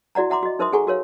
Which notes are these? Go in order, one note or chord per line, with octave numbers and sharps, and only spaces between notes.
E4 F#4 D5 F#5 A#5
E5 F#5 A#5 C6 D6
F#4 D#5
D#4 A#4 C5 E5 C6 D#6
G#4 A4 F#5 G#5 A#5 C#6
F#4 A#4 C#5 F5